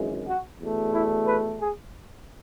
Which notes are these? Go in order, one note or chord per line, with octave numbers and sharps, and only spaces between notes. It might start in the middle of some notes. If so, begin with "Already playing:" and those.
Already playing: G#1 F#2 C#3 E3 G#3
F#4
E2 B2 A3
E4
B4
G#4